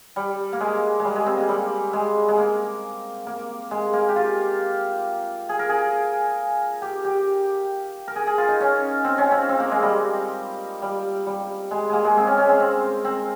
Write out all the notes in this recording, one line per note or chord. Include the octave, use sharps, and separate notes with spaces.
G3
A#3
G#3
G#3
G3
G#3
C4
A#3
G3
G#3
G#3
A#3
A#3
G#3
A#3
G4
F4
G#4
A#4
G#4
G4
G4
A#4
G#4
G#4
F4
D#4
C#4
C4
C#4
C4
C4
A#3
G#3
G3
G3
G3
G#3
G#3 A#3
G#3
C4
C#4
C#4
C4
C4
C4